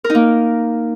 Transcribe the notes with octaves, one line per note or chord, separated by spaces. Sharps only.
A#4
D#4
A#3